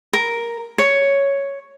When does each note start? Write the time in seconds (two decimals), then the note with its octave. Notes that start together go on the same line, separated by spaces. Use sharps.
0.13 A#4
0.78 C#5